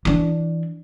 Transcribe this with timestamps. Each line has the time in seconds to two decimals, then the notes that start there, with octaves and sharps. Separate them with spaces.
0.05 E3 D4